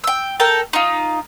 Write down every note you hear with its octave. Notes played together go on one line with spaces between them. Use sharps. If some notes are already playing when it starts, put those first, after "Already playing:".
G5 E6
A4 A#4 G5 A5
D#4 F4